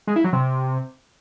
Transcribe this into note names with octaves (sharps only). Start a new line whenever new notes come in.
G#3
E4
F#3
C3